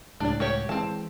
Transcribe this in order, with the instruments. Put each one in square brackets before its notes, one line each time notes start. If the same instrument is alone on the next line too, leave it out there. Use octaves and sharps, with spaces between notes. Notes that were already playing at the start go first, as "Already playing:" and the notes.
[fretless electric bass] C#2 A2 G3 [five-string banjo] D4 D5
[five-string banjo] F#4 G4 C#5
[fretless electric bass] E3 G#3 [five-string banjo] C4 A5